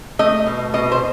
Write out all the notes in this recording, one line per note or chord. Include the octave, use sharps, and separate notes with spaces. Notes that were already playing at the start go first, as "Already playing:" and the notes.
A3 D#5
B2
B2 D#5
C5